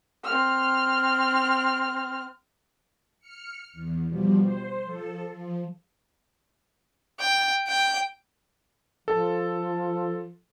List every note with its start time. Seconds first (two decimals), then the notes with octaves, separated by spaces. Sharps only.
0.24 C4 F6
3.20 F6 C#7
3.73 E2
4.09 B2 F3 G3
4.43 C5
4.83 F3 A4
5.32 F3
7.20 G5
7.68 G5
9.08 F3 A4